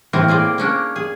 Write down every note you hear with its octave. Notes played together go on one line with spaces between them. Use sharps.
A2 E3 A#3 C4 A#4
A#3 G#4 C5 D5
A#3 C#4 D4
G#4